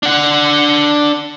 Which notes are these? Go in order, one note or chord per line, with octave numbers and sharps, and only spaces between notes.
D4 F#5